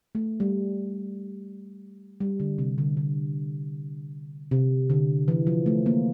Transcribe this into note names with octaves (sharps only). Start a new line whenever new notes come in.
A3
G3
G3
D3
C3
D3
D3
C3
D3
E3
F3
A3
A#3